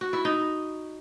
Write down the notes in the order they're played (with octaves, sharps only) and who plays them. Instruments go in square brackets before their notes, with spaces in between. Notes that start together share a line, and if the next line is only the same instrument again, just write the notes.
[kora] F#4
E4
D#4